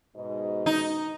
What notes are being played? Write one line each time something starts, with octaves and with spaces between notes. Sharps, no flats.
G#2 B2 D#5
D#4